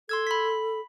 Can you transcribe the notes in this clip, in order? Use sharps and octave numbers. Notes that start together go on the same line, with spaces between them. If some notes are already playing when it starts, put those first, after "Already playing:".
A4 C6 E6 G#6
B5 B6